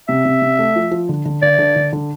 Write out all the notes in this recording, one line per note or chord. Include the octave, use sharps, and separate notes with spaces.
C3 E5
C3
C3
A3
F3
F3
D3
D3
D3 D5
D3
D3
D3